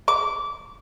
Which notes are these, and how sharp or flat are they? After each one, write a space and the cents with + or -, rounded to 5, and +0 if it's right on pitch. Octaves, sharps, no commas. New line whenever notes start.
D6 -25